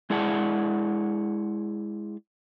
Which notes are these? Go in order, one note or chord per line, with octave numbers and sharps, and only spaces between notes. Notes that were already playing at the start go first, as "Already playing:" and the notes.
G#3 E4 G#4 D5 F#5 A5